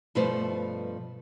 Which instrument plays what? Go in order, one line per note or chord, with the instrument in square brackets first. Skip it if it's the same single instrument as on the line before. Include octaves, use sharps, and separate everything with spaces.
[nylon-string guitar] G2 B2 F3 A3 B4 C5